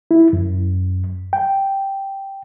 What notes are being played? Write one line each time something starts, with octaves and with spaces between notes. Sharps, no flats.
E4
F#2
G5